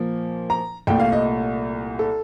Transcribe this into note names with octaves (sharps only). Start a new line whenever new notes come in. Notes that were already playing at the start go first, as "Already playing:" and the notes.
Already playing: A#2 F3 A#3
A#5
C2 A#2 A3 G5
F5
D#5
A4